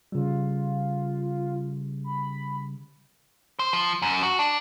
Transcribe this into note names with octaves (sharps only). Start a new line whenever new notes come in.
C#3 G3 F4
B5
C5
F3
F#2
F#4
D4